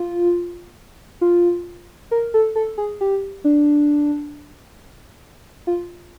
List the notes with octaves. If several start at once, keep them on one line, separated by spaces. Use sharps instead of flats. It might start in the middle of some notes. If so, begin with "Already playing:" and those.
Already playing: F4
F4
A#4
A4
A4
G#4
G4
D4
F4